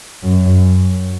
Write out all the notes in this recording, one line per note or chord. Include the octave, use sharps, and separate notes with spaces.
F#2